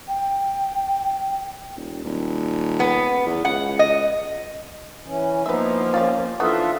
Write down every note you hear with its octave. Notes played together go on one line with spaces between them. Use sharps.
G5
E1
D#1
B3
E2
C#2 F#5
D#5
E3 C#4
F3 A#3 B3 D#4 B4 E5
C#4 F4 G4 D5
E3 B3 D4 D#4 F4 F#4 A4 E5